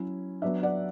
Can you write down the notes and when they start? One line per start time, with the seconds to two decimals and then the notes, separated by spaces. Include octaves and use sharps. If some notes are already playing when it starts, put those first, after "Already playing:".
Already playing: F#3 C#4 E4
0.42 F#3 B3 D4 E5
0.63 D5 F#5